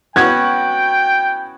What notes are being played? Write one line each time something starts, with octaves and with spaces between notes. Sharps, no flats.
B3 C#4 E4 F#4 G5 G#6